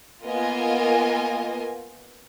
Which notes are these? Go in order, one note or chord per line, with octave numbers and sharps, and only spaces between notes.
A#3 B3 F4 A#4 D#5 G#5